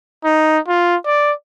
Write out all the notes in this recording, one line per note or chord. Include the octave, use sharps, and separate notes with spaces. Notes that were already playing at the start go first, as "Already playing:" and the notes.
D#4
F4
D5